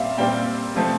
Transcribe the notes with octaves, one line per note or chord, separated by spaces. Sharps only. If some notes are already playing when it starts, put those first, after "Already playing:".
Already playing: A#2 G3 C4 E5 F5
A#2 G3 C4 G5
C3 F3 A3 C4